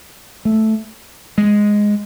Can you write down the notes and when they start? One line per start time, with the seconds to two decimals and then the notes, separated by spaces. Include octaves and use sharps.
0.45 A3
1.38 G#3